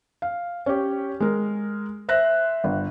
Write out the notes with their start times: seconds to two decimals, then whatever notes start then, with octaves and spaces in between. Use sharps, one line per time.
0.22 F5
0.66 C#4 G4
1.20 G#3 A#4
2.08 C5 E5 F#6 A#6
2.64 G1